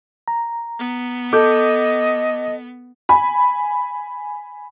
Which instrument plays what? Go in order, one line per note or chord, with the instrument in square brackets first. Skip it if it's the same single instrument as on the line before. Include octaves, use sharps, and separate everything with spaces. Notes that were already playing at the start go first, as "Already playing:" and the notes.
[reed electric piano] A#5
[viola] B3
[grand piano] A4 [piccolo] D#5 [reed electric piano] D6 G6
[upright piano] G#5 B5